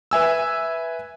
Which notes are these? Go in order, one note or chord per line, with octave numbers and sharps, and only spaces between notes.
B4 E5 G#5 E6